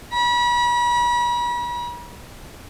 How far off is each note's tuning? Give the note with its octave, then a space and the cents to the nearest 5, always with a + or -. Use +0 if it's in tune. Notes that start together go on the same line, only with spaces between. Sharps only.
B5 -40